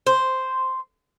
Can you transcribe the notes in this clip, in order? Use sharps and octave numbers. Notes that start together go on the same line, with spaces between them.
C5